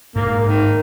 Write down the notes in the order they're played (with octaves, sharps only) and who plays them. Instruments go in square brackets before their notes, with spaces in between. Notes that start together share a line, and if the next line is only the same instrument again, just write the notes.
[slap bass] G#2 [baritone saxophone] A#3
[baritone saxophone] D#3